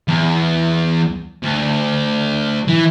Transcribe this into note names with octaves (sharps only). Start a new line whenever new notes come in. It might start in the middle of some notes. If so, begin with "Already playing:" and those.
E2
D2
E3